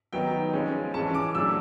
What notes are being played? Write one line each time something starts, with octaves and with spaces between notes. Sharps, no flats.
D#3 F#3 B3 D#4 G5
F3 G#3 C#4
E3 G#3 C#4 A5
D6
A#2 F#3 A3 D4 E6